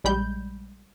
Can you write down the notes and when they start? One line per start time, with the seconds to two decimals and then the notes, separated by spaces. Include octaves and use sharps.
0.04 A#1 G3 G#3 B5 G6